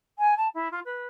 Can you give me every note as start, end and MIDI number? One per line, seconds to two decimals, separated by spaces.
0.18 0.34 80
0.37 0.47 81
0.54 0.68 64
0.71 0.79 65
0.85 1.08 71